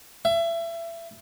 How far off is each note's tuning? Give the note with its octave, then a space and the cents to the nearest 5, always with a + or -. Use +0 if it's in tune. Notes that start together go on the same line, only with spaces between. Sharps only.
E5 +30